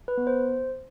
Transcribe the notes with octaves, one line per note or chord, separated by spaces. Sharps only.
B4
B3
C5